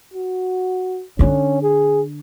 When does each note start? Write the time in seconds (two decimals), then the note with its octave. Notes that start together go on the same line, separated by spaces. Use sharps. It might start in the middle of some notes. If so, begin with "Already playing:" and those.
0.14 F#4
1.19 D3 C#4 D4
1.62 G#4